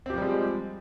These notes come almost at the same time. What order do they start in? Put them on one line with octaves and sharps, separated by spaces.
C4 G4 F3 G3 G#3